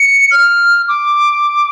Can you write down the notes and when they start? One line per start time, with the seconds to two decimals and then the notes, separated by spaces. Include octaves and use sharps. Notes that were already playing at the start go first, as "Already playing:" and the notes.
Already playing: C#7
0.31 F6
0.88 D6